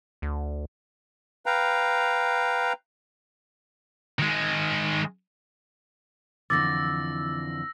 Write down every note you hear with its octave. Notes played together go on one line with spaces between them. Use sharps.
D2
B4 F5 G5 A#5
D#3 G#3
F2 D3 E3 D6 E6 A6 A#6